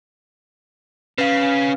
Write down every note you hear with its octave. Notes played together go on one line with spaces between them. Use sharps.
C#3 B4 F5